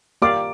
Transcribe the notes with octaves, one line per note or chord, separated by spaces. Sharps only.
A#3 G4 D5 F5 D6